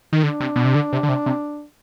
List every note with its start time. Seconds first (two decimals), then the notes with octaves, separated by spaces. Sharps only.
0.13 D#3
0.23 D3 D4
0.40 C3
0.56 B2
0.65 C3
0.75 D3
0.93 C3
1.03 D3
1.09 C3
1.26 C3